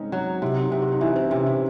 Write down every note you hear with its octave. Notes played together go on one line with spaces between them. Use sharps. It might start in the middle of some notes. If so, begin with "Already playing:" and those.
Already playing: G#3 C4 C#4 D#4
F#3
C3 E4
D#4
C3
F#4
D#4
E3 E4
C4
C3 C#4
E4